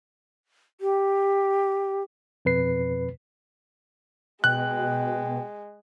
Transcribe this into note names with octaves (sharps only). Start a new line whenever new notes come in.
G4
F2 B2 B4 C7
B2 G#3 G5 F#6